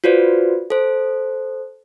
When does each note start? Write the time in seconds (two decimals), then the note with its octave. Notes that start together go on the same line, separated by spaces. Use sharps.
0.04 F4 F#4 B4 C5 D5
0.70 A4 C5